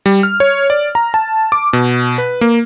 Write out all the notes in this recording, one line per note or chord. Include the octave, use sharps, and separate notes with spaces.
G3
F6
C#5
D5
A#5
A5
D6
B2
B4
A#3